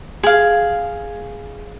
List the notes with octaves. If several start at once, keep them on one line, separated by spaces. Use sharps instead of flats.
G#4 F5